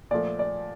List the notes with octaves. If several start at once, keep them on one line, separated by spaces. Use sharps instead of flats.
A#2 F3 A3 D5
D5